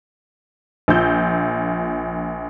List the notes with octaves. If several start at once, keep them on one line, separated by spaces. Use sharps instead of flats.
A#1 F4 E6 G6